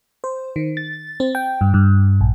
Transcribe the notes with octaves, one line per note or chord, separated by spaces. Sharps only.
C5
D#3
A6
C4
G5
G2
G2
A#1